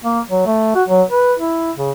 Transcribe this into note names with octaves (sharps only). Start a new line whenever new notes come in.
A#3
F#3
A3
F#4
F#3
B4
E4
C#3